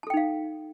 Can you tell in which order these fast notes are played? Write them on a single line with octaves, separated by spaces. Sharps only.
A5 A4 G5 D#4 F5